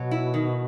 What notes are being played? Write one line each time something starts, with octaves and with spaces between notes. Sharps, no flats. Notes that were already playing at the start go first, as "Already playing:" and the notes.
Already playing: B2 F#3
E4
D#3